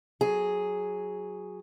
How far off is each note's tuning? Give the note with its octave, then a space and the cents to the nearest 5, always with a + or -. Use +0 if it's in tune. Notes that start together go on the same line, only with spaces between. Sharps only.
F#3 +0 G#4 +0